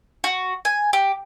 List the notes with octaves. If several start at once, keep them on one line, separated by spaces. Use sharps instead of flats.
F#4
G#5
G4